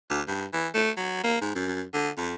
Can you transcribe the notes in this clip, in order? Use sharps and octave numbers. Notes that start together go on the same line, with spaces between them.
D2
G2
E3
A3
F#3
A#3
G#2
F#2
D3
F2